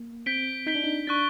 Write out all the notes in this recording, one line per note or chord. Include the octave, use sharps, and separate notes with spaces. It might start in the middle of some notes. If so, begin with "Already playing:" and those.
Already playing: A#3
C4 G6 B6 D7 G7
D#4 G6 B6 D7 G7
D4
D#4
D4 C#6 F#6 A6